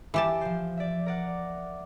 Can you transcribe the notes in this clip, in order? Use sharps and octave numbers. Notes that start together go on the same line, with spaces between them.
E3 G4 A5
F3 C5
D5 E5
A#4 D5 F#5